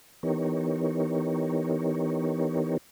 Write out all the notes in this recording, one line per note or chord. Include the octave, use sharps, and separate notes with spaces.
E3 B3 D#4 G4 A#4 C#5